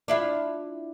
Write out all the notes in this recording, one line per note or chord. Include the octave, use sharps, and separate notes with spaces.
D4 E4 F4